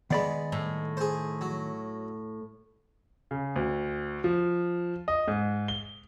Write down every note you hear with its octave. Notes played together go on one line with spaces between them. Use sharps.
D#3 G#3 B3 D5 B5
A2
G#4 C5
F#3
C#3
D2
F3
D#5
G#2
G7